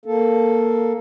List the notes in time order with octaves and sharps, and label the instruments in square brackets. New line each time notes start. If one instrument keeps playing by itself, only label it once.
[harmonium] A#3 A4